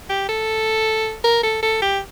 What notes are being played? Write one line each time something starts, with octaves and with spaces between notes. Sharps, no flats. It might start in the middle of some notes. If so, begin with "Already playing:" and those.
G4
A4
A#4
A4
A4
G4